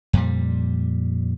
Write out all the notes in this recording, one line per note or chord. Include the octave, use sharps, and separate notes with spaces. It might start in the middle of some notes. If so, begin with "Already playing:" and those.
F2 A#2 G3